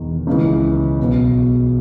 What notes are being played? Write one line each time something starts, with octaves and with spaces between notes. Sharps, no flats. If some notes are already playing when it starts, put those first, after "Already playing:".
Already playing: E1 E2 D#3
C#2 C#3 E3
B1 B2